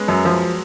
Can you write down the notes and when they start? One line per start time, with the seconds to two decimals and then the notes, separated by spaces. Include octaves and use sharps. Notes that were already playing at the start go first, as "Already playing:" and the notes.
Already playing: G#3 B3 C#4
0.08 F#2 F#3
0.25 F3